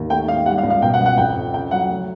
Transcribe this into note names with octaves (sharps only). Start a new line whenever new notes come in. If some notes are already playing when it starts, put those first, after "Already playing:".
Already playing: D#2
A3 G5
G#2 F5
G3 F#5
F5
C#2
F5
B2 G5
F#5
C#2
F#5
F2 G5
F2
C#3 G5
F#3 F#5
A3